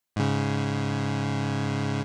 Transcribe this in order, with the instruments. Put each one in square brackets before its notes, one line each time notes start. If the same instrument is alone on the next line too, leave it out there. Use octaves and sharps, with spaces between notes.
[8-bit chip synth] G#2 C#3